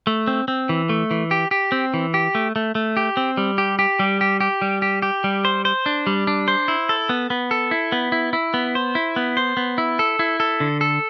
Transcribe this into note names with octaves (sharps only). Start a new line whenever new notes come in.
A3
C4
C4
E3
A3
E3
G4
G4
C4
E3
G4
A3
A3
A3
G4
C4
G3
G4
G4
G3
G4
G4
G3
G4
G4
G3
C5
C5
D4
G3
D4
C5
E4
A4
B3
B3
A4
E4
B3
E4
E4
B3
C5
E4
B3
C5
B3
E4
A4
E4
A4
D3
A4